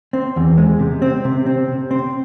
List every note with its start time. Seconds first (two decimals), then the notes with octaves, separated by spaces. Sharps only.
0.13 C4
0.36 E2
0.57 G#3
0.79 C3
1.02 C4
1.25 C3
1.46 C4
1.68 C3
1.91 C4